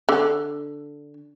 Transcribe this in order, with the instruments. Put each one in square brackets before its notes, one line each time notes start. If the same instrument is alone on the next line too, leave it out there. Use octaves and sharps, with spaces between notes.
[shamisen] D3